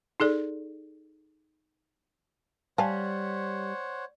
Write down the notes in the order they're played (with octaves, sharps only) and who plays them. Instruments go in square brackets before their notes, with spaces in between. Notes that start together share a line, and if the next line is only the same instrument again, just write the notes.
[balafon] D#4 G#4 A4 D5
[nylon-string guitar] G3 [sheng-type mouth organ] C5 C#5 F#5 [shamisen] F5 G#5 A5